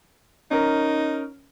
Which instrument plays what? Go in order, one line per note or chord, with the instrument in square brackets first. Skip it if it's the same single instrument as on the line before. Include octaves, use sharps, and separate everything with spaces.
[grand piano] C#4 A#4 [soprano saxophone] D#4